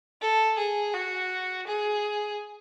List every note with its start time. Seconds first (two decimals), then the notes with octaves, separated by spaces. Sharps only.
0.21 A4
0.58 G#4
0.94 F#4
1.67 G#4